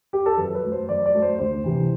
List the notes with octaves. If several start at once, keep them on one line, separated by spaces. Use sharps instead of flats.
G4
A4
F#2 B4
B4
F#3 A3
C5
F#2 D5
D5
F#3 A3
C5
D2 C5
C3 E3